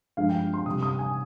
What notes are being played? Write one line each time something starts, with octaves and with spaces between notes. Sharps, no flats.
G2 F3 G#3 F5
G5
C6
C3 G3 D#6
D#6
G#5